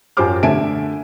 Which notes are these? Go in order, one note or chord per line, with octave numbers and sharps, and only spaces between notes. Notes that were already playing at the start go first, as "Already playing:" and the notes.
F#2 F4 G4 C5 D6 F6
D3 A3 E5 G#5 A5 D7